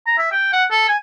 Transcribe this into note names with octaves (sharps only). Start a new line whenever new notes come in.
A#5
E5
G5
F#5
A4
G#5